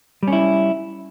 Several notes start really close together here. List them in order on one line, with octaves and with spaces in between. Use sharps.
G3 C#4 E4